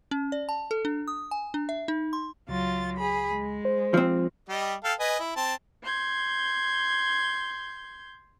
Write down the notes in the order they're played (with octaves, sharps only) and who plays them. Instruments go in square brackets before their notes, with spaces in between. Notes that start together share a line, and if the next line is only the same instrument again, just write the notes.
[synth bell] C#4
D5
A5
A4
D4
D#6
G#5
D4
E5
D#4
C6
[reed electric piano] C#2 [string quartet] F#3 F4 A6
[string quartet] G#4 B5
G#3
[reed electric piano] C5
[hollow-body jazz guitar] F3 C4
[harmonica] G3 G4 D#5
A4 F5 G5
B4 D#5 G#5
E4
C4 A5
[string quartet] C6 G6 G#6